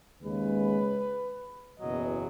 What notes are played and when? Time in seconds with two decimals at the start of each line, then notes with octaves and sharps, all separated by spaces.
0.21 D#2 C#3 G#3 B4
1.80 F#1 E2 B2 F#3 D#5